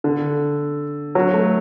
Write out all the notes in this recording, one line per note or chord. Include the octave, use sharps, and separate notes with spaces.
D3
F#3
A3